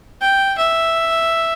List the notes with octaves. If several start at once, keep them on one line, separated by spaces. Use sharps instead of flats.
G5
E5